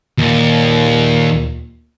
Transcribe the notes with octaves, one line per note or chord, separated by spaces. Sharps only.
D#2 A#2